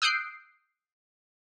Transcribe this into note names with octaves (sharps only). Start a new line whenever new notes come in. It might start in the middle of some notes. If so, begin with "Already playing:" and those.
D#6 E6 F#6 G6 C7 D7